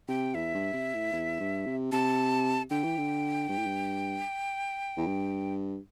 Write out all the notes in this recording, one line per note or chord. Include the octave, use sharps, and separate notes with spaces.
C3 G5
E2 E5
G2
C3
A2
E2
G2
C3
C3 A5
D3 G5
E3
D3
G2
A2
G2
E2
G2